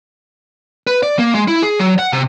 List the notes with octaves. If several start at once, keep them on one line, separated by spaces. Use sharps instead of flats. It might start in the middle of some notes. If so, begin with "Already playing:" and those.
B4
D5
A#3
G#3
E4
G#4
F#3
F#5
C3